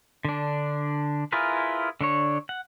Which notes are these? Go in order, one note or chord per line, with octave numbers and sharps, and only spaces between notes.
D3 D4
E4 F4 G#4 A#4 B4
D3 D4 C#5
F#5